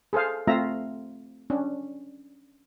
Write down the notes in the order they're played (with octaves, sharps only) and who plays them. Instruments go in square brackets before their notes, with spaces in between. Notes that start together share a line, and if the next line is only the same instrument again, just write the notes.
[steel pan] G#4 A4 C5 F5
A3 C4 F4 E5 A#5
C#4 D4